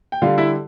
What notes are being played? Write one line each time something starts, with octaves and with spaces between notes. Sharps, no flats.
G5
D3 G3 F4 F5
E4 E5